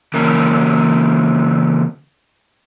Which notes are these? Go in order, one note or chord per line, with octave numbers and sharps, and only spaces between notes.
C#3 E3 A#3 C#4 A#4